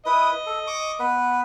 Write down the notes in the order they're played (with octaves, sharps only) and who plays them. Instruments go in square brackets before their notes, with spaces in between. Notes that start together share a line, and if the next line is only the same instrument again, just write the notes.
[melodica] E4 B4 D#6 [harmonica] D#5
[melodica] A4
C#6 D6
B3 B4